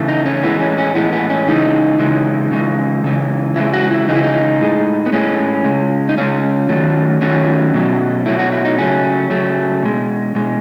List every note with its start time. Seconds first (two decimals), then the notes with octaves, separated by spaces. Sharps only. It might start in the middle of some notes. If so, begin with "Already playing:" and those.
Already playing: C#3 E3 A3
0.08 D#4
0.26 C#4
0.43 A2 E3 G#3 B3
0.60 C#4
0.78 C#4
0.95 A2 E3 G#3 B3
1.13 B3
1.30 C#4
1.48 C#3 E3 G#3 D#4
1.99 C#3 E3 G#3
2.51 C#3 E3 G#3
3.04 C#3 E3 G#3
3.56 C#3 E3 G#3 E4
3.73 F#4
3.90 E4
4.08 C#3 E3 G#3 D#4
4.16 E4
4.23 D#4
4.61 A2 G#3
5.06 B3
5.13 A2 G#3 C#4
5.64 C#3 G#3
6.09 D#4
6.17 C#3 G#3 C#4
6.69 D#3 F#3 A3
7.21 D#3 F#3 A3 C#4
7.74 B2 F#3 A3
8.26 B2 F#3 A3 E4
8.39 F#4
8.52 E4
8.65 D#4
8.78 C#3 F#3 A3 C#4
9.30 C#3 F#3 A3
9.83 B2 G#3
10.35 B2 G#3